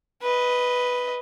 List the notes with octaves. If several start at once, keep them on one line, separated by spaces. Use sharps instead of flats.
B4 D#5